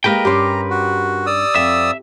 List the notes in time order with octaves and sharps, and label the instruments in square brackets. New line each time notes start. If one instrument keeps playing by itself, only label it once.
[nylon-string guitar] G#3 A#3 G4 [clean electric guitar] A#4 B4 G5 [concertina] A#5
[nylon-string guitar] G2 C#4 [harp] G4 C6
[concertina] F#4
D5 D#6 E6
[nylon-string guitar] F2 [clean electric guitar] E5